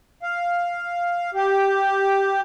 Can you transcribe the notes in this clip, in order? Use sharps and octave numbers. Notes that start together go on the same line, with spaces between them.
F5
G4